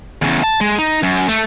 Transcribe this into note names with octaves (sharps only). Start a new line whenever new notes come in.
E2 C#3
A5
G#3
D#4
F#2
A3